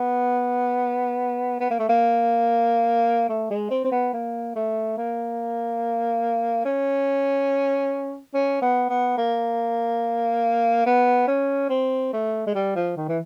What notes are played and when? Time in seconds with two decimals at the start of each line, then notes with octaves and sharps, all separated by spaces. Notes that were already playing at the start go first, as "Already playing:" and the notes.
Already playing: B3
1.60 B3
1.70 A#3
1.79 A3
1.89 A#3
3.29 A3
3.50 G#3
3.71 C4
3.84 C4
3.91 B3
4.13 A#3
4.55 A3
4.97 A#3
6.65 C#4
8.34 C#4
8.62 B3
8.89 B3
9.18 A#3
10.86 B3
11.28 C#4
11.70 C4
12.13 A3
12.46 G#3
12.55 G3
12.76 F3
12.97 D#3
13.09 E3